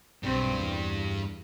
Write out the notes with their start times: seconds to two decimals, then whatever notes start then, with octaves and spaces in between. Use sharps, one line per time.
0.23 B1 G2 C4
0.56 E2